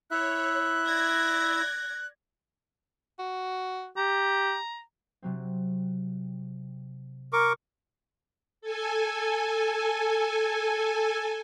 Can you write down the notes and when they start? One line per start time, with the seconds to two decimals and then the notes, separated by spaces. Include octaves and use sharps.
0.11 E4 C#5 E5 F#6
0.85 D5 G#6 A#6
3.19 F#4
3.97 G4 A#5
5.22 C3 F#3 C4
7.33 A#4 C#6 D6
8.61 A4 G#5